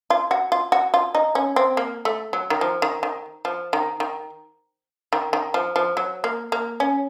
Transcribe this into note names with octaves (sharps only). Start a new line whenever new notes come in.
F4
F#4
F4
F#4
F4
D#4
C#4
C4
A#3
A3
F#3
D#3
F3
D#3
D#3
F3
D#3
D#3
D#3
D#3
F3
F3
F#3
A#3
A#3
C#4